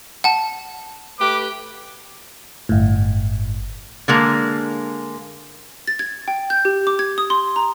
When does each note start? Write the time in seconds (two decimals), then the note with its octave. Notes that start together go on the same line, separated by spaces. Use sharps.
0.24 F#5 A5
1.20 A3 G4 B4 D6
2.69 G1 A2
4.08 D3 G#3 A#3
5.87 A6
5.99 G#6
6.28 G5
6.50 G6
6.65 G4
6.87 D6
6.99 G#6
7.18 D#6
7.30 C6
7.56 A#5